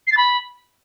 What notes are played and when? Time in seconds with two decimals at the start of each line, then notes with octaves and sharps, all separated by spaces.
0.07 C7
0.12 A6
0.17 B5